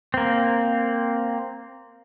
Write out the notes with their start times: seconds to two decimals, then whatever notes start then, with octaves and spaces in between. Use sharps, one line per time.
0.14 A#3 C4